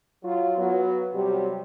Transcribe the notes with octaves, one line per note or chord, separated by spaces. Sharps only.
F#3 F4
F#3 B3
C3 F#3 G3